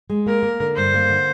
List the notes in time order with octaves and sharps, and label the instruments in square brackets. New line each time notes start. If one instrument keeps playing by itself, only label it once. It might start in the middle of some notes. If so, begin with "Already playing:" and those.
[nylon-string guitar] G#3
[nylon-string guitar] A#3 [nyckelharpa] A#4
[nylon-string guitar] A#3
D3
[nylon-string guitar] G2 [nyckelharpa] C5
[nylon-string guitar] A#3
D3